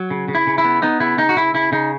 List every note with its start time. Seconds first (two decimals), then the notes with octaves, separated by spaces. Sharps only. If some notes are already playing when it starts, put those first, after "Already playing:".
Already playing: F#3
0.10 C#3
0.28 C#3
0.35 E4
0.47 C#3
0.58 E4
0.64 B3
0.82 B3 D#4
1.00 C#3 E4
1.18 C#3 D#4
1.29 F#4
1.36 C#3 E4
1.54 C#3 E4
1.72 C#3 D#4